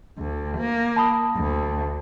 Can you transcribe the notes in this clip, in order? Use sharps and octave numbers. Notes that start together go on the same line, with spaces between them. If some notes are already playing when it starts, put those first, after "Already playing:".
D2
A#3
A5 B5 D#6
D2